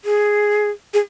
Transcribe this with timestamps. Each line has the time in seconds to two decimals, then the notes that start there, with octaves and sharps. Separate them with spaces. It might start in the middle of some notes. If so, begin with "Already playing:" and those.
0.05 G#4
0.94 G#4